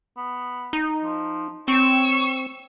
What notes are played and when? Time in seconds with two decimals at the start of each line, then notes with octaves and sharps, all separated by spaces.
0.17 B3
0.73 D#4
1.04 F3
1.68 C4 C#5 C#6 E6